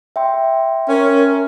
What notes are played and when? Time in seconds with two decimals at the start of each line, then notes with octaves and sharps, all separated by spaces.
0.16 E5 G5 C6
0.89 C#4 A#4